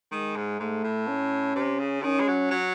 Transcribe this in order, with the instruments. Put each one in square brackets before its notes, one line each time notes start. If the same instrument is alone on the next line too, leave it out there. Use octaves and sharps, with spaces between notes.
[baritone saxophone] D#3 [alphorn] G#3
[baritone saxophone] G#2
[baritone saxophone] G#2 [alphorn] A3
[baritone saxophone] A2
[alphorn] C#4
[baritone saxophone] C3
C#3
[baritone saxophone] D#3 [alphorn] C#4
[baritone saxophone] G#3
F#3
F#3